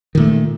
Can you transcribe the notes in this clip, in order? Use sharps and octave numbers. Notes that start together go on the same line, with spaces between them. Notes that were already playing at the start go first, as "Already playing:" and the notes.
A#2 D#3 A3